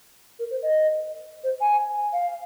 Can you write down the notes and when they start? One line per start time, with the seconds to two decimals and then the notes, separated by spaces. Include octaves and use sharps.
0.39 A#4
0.51 C5
0.63 D#5
1.44 C5
1.61 G#5
2.13 F5